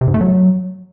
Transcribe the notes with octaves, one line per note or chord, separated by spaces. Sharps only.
C3
G#2
A3
F#3